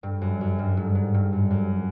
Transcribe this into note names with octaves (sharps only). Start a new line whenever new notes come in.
G2
F#2
F#2
G2
G#2
G#2
G2
F#2
F#2